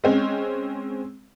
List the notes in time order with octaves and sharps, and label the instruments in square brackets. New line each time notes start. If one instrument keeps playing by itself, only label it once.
[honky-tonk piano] G#3 C4 C#4